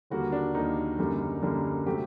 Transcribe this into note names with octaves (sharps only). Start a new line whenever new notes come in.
D#2 D3 G3 A#3 F#4
D4
D#2 D3 G3 A#3 D#4
F#2 D3 G3 A#3
F#2 D3 G3 A#3
C3 F#3 A3 G4